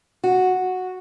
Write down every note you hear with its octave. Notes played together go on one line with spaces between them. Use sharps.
F#4